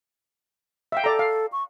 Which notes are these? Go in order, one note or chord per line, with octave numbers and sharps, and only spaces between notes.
E5 F5 G5
A4 D5 A#5
F5
C#6